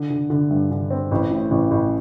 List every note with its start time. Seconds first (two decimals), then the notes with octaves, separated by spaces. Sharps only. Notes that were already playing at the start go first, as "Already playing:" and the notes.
Already playing: D3
0.10 D3
0.30 D3
0.51 G2
0.71 D3
0.91 C4
1.11 A1
1.31 A2
1.51 A1
1.71 A1